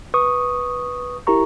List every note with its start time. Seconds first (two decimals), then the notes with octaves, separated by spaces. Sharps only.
0.14 B4 C#6 D#6
1.27 E4 G4 A#4 A#5 C#6